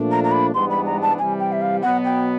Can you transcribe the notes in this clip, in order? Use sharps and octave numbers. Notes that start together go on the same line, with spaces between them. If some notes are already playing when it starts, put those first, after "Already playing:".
Already playing: A#2 F3 A3 D4
A#5
A#5
B5
G#2 E3 G3 B3 D4 C6
B5
A#5
A5
C3 E3 G3 G#5
G5
E5
F5
B2 F#3 B3 F#5
G5